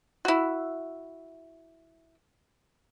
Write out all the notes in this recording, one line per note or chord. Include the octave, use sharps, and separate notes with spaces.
E4 F#4